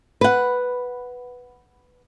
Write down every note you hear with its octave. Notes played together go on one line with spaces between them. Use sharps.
B4 F#5